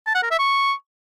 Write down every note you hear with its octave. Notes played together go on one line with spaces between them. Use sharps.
A5
F#5
A#4
E5
C#6